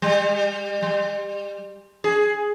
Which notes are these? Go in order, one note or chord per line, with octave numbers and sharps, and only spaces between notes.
G3
G3
G#4